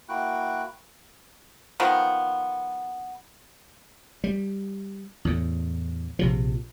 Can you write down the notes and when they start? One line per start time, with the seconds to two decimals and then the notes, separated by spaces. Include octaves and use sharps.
0.09 A#3 E4 F#4 G5 F#6
1.80 D#3 F3 B3
4.24 G3
5.25 E2 A2
6.19 A#1 C3 F3